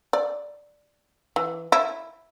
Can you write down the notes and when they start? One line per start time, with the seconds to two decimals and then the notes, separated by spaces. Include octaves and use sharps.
0.13 D5
1.36 E3
1.72 E4